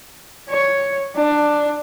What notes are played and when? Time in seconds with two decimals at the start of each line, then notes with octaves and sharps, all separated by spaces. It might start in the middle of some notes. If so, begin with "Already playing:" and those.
0.50 C#5
1.16 D4